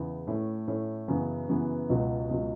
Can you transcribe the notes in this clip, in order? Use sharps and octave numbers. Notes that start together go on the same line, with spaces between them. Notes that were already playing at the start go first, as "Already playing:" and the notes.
Already playing: E2 C#3 E4
A2 A3 C#4
A2 A3 C#4
F#2 C#3 E3 B3
F#2 C#3 E3 B3
C#2 B2 F#3
C#2 B2 F#3